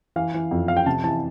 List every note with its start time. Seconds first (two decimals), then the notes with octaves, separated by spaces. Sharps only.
0.16 E3 F5
0.34 E3
0.51 F2
0.68 F2 F5
0.77 G5
0.86 C3 A5
1.04 E3 A5